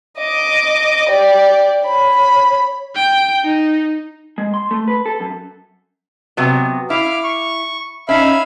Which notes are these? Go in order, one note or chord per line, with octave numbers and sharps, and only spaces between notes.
D#5 D6
G4 D5
C#5 B5
G5
D#4
G#3
C6
A3
B4
A4
F#2
C3 F#3 B3
E4 F5 D6 F6
C#6
C#4 D#4 E5 F5 B5